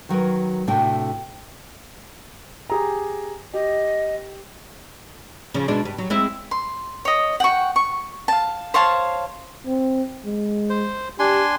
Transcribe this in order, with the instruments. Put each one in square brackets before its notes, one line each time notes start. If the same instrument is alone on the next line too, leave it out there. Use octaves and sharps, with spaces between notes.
[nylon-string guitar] D#3 F#3 A#4 B4
A2 C3 A3 D4 F#4 G5
[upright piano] G4 G#4 A#5
[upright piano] G4 [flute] D#5
[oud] C#3 F3
B2 G#3 D4
G2
F#3
G#3 C4 E4
[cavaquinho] C6
C#5 D#5
F#5 G5 C#6
C#6
F5 A5
C5 C#5 F5 A5
[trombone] C4
G#3
[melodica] C5
[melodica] D4 G#5 C6 [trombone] G4